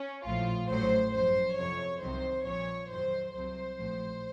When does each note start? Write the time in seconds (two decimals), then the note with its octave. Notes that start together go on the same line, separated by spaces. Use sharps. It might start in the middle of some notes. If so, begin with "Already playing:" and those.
Already playing: C#4
0.26 A#1 A2 F3 F4
0.69 A1 A2 F#3 C5
1.14 F#2 F3 C5
1.57 F2 C3 F#3 C#5
2.02 C2 C3 D#3 F#3 C5
2.46 A#1 A#2 F3 C#5
2.90 F2 D#3 F#3 C5
3.34 C2 C3 F#3 C5
3.78 A#1 A2 F3